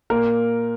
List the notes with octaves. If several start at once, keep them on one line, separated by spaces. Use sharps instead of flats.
A#2 A#4